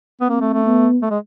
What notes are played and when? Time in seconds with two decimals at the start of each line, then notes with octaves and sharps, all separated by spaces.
0.21 B3
0.29 A#3 C4
0.41 A3
0.53 A3
0.66 B3
1.02 A3
1.10 G#3